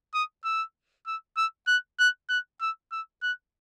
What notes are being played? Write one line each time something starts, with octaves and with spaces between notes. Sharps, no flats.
D#6
E6
E6
E6
F#6
F#6
F#6
E6
E6
F#6